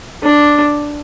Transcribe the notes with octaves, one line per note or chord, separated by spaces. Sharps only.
D4